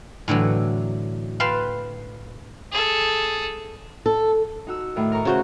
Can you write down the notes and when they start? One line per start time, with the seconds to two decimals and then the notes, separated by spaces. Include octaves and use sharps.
0.28 A2 D3 E3 F#3
1.40 B4 F5 G5 A5 C6
2.72 G#4 A4
4.06 A4
4.67 D#4 F#4 E6
4.96 A2 D#3
5.12 A#4 A#5 C#6
5.25 C#3 F#4 C5